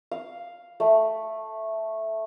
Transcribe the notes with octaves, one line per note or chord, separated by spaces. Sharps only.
F5
A3